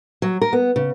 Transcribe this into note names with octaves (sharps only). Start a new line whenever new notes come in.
F#3
A#4
B3
C#3